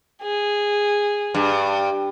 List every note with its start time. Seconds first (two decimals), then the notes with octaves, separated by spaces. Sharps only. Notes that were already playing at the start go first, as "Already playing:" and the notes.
0.22 G#4
1.35 G2